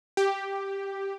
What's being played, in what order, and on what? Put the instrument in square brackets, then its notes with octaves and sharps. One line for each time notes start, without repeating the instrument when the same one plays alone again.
[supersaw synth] G4